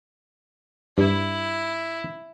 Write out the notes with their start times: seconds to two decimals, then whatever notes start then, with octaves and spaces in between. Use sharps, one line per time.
0.98 G2 E4